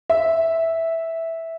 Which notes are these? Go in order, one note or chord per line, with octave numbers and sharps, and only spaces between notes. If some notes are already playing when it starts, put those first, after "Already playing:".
E5